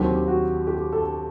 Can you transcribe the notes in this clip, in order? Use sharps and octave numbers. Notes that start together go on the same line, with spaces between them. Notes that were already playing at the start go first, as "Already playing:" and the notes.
Already playing: D#2 D#3 F#3 C4 G4
F#4
G4
A4